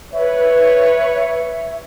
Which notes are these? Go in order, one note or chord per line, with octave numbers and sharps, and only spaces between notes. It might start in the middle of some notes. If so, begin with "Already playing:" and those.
B4 C#5 E5